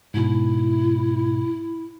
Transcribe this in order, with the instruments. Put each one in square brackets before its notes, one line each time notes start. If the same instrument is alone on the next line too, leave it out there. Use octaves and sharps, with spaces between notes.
[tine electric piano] G#2 B2 [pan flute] E4